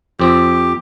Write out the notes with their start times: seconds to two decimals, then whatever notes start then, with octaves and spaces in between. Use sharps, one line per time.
0.20 F2 C4 G4